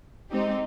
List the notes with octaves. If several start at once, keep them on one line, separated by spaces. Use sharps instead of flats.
G#3 C4 D#4 G4